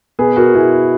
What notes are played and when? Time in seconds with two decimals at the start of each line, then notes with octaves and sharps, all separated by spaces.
0.19 B2 G#4 B4
0.36 F#4 A#4
0.55 B2 E4 G#4